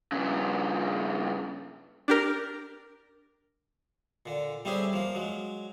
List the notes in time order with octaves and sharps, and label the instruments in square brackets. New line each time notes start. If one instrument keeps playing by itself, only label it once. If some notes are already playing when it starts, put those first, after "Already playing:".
[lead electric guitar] G2 C#3
[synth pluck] D4 G4 A#4
[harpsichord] A#2 D3
G3 A3 C4 C#4 G4 G#4
F3 A#3
F#3 G#3